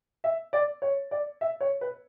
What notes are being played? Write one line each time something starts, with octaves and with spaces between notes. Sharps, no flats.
E5
D5
C#5
D5
E5
C#5
B4